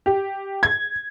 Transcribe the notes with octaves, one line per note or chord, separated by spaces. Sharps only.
G4
G#6